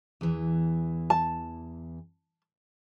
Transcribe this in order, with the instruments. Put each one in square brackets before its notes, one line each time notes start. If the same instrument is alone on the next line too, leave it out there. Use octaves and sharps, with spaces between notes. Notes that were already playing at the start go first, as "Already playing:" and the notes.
[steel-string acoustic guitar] E2 E3
[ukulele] A5